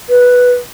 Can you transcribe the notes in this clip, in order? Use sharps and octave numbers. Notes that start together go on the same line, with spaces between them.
B4